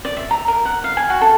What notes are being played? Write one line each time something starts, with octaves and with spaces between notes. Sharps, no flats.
D5
E5
A#5
A#4
F#5
F5
G#5
F#4
A4